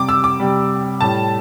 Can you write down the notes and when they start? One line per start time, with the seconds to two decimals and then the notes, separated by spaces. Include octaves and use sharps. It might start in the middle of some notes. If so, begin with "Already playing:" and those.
Already playing: C3 G3 D6
0.09 E6
0.24 D6
0.40 C3 G3
1.01 A2 G3 A5